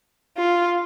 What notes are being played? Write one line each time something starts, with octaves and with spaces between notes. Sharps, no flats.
F4